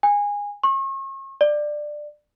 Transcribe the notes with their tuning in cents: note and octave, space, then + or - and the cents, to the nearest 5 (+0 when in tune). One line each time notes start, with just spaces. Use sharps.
G#5 -20
C#6 -40
D5 +15